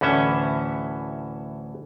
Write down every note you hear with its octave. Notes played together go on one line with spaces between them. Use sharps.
D2 A2 E3 C#4 E5